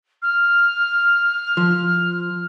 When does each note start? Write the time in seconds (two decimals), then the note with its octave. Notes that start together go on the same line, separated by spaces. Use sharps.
0.22 F6
1.57 F3